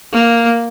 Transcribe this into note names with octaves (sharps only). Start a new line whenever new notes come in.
A#3